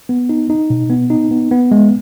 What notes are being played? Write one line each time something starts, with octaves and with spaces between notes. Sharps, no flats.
B3
D#4
D#4
B2
B3
D#4
B3
B3
G#3